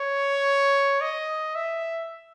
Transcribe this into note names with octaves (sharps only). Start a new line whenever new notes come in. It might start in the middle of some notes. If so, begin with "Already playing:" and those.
Already playing: C#5
D#5
E5